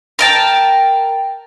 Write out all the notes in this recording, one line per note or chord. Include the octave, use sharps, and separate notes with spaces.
A#4 G5 A5